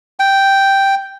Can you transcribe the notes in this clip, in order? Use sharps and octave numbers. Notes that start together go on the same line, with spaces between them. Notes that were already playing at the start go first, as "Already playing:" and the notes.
G5